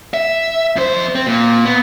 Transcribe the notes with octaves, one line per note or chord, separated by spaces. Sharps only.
E5
F2 C5
C4
A#2
B3